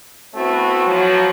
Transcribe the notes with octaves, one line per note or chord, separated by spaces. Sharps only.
A3 B3 C4 E4 F#4
F3 F#3